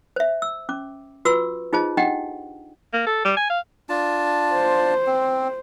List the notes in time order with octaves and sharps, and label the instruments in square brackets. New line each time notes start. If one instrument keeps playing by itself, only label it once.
[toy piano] C5 E5
E6
C#4 D6
F4 F#4 B4 C#6 E6
D#4 F4 G#4 C5 D#5 A5
D4 D#4 G4 D#5 F#5 G5
[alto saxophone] A#3
A4
G3
G#5
F5
[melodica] D4 F4 A5
[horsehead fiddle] C5
[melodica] C4